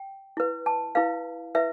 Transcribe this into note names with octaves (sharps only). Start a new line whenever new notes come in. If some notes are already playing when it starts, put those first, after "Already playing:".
Already playing: G5
E4 B4
A5
E4 B4 F5
E4 B4 E5